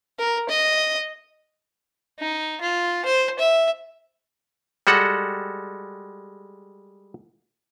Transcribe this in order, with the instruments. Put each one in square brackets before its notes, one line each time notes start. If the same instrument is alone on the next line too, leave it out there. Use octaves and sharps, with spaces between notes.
[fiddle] A#4
D#5
[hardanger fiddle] D#4
F4
C5
E5
[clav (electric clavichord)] G3 G#3 F#4 A4 F#5